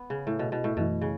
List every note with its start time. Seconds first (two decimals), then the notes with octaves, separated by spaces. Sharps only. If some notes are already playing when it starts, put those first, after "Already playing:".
Already playing: B3
0.10 C#3
0.27 A2
0.39 B2
0.52 B2
0.64 A2
0.77 F#2 B2 E3 A3 E4
1.01 C#3